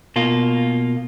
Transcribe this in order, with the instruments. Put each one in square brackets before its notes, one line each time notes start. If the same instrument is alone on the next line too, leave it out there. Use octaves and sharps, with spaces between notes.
[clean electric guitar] B2 A#3 F4